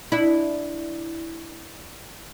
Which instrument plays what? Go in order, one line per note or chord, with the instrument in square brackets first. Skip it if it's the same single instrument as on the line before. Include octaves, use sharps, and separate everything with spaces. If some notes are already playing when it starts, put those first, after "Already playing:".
[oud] D4 E4